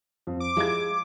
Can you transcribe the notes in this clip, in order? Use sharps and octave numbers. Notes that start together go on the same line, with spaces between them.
F2
D6
F3 G#3 E4 G4 G#6